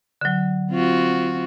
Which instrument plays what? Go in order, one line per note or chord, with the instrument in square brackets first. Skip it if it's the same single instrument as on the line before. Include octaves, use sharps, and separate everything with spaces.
[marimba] D3 F#3
[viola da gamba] C4 F4 F#4